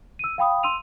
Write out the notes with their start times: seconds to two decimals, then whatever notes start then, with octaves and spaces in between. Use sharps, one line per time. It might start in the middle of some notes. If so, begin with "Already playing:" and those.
0.19 E6 D#7
0.38 F5 G5 B5 D#6
0.63 C6 E6 D#7 F7